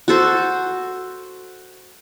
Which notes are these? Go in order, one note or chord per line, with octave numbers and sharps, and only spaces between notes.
F#4 A4 C5